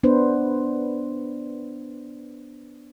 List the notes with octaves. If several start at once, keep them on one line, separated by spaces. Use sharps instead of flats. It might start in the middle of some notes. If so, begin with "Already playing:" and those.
B3 D4 B4 C5